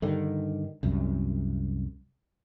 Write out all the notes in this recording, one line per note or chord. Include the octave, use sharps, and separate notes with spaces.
G2 D3 D#3
C2 F#2